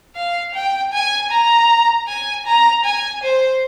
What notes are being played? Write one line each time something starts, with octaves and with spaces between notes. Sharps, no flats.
F5
G5
G#5
A#5
G#5
A#5
G#5
C5